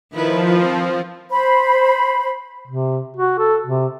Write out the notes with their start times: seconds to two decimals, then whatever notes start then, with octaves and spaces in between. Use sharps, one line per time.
0.13 D#3 F3 E4 B4
0.59 C4
1.31 C5 B5
2.68 C3
3.17 F#4
3.39 A4
3.67 C3